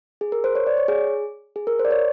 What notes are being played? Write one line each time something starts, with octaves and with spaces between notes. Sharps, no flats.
G#4
A#4
C5
C#5
D5
C#5
G#4
G#4
A#4
C5
D5
C#5